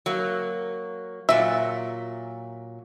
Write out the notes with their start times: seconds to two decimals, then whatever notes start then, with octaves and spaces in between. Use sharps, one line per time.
0.06 F#3 A#3
1.29 A#2 F#3 E5